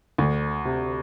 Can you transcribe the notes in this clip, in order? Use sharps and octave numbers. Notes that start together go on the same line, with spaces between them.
D2
C3